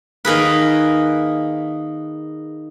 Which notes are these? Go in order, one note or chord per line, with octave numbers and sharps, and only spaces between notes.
D#3 A#3 G#4 B4